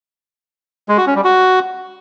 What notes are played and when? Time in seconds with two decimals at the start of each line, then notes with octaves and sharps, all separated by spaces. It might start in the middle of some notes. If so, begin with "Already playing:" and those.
0.89 G#3
0.98 F#4
1.07 C#4
1.16 G3
1.24 F#4